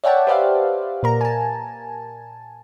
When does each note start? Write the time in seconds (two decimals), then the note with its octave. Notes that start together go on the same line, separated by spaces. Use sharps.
0.04 C#5 D5 E5 F#5 G5 A5
0.27 G4 B4 C5 D5 E5 F5
1.03 A#2 A#4 A#5
1.21 G#5 A5